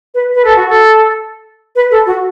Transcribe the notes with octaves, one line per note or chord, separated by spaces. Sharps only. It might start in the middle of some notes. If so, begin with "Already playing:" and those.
B4
B4
A4
F#4
A4
B4
A4
F#4